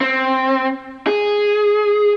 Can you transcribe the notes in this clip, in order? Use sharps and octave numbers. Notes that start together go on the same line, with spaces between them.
C4
G#4